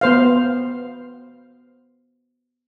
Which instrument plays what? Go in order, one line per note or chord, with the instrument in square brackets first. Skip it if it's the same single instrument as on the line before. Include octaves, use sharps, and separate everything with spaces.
[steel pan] B3 C5 F5